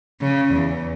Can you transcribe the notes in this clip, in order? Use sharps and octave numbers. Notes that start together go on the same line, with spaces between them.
C#3
E2